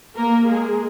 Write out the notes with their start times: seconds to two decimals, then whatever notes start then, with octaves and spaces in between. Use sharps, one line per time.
0.16 A#3 A#4
0.47 G#3 G#4